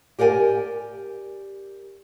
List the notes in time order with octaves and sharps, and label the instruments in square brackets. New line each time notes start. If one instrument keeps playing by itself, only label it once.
[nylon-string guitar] G4 A#4 D5 F#5 G#5